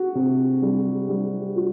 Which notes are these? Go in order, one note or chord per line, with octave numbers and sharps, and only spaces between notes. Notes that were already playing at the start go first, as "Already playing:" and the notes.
Already playing: F#4
C3
G3
G3
F#4